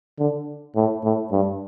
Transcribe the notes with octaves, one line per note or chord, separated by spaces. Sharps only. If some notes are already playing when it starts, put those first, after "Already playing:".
D3
A2
A2
G2